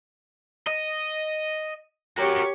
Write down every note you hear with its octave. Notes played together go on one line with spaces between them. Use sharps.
D#5
F#4 G4 A#4 C#5